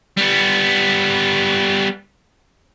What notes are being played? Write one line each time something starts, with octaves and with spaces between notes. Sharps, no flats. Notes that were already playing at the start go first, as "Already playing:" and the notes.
G3 B3